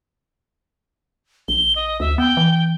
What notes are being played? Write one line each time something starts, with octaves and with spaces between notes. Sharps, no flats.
A#1 G7
D#5
D2 E5
B3 G5
E3